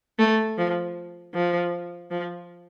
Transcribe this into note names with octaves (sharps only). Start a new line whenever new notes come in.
A3
F3
F3
F3